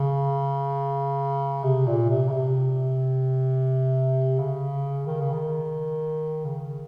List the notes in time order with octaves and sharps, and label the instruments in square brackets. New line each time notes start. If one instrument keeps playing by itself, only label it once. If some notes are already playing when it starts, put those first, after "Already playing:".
Already playing: [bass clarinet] C#3
C3
A#2
C3
C#3
C3
C#3
D#3
C#3
D#3
C#3